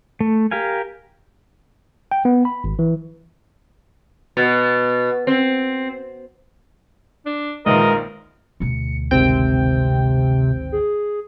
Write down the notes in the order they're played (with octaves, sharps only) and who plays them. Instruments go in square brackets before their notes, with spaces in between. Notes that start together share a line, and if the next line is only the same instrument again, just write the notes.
[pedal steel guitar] A3
G4 A#4 F5 G#5
[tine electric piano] G5
B3
B5
G#1
E3
[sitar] B2
C4
[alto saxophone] D4
[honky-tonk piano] A#1 D#3 F4 [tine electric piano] G#3 B4 E5 [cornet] A#4 [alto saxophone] D#5
[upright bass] D2 B2 [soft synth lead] C#7
[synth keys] G#1 C4 G5 [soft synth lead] C3
[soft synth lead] G#4